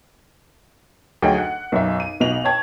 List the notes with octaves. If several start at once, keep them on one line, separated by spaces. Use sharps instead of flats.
D2 F#3 D#4 G#4 D#5 G5
F#5
B1 F#2 E5
D#7
B1 B2 D#5 F7 F#7
C#5 G5 A5 G#6